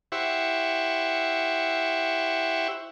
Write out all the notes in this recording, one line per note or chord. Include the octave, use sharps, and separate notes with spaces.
E4 G4 C5 E5 F#5 C#6